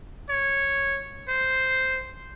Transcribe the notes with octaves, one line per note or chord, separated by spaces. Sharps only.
C#5
C5